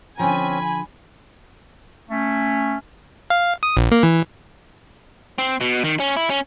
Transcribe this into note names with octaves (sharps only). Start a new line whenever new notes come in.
D3 F3 C4 C#4 G#5 B5
A3 C#4
F5
D#6
A#1
A#3
E3
C4
B2
D#3
C#4
E4
C#4